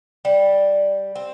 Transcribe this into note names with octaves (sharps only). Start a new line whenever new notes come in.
G3
C4